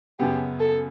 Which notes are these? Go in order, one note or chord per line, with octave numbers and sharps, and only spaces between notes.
F#2 C#3 F#3 B3 G4
A4